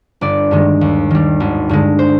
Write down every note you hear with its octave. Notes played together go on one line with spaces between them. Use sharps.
G1 D5
G2 D#3 G#3
D#2
D#3 G3
G#1
G2 D3 G#3
C5